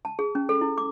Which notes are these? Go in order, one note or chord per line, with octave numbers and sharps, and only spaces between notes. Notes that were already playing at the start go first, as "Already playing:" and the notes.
A5
G#4
C#4
A4
E4
D6